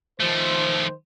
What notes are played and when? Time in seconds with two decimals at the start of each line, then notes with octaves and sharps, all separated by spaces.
0.20 D#3 F3 A3 C5